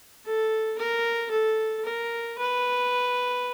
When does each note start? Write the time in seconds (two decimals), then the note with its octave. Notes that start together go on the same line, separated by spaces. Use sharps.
0.25 A4
0.78 A#4
1.31 A4
1.85 A#4
2.38 B4